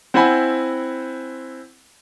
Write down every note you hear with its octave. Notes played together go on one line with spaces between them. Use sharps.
C4 E4 C5 F#5 G#5 B5